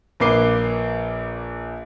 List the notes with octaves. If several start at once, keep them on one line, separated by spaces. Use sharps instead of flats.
A#1 A#3 B4 D6 C7 G7